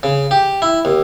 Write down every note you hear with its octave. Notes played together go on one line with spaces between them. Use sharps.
C#3
G4
E4
D#2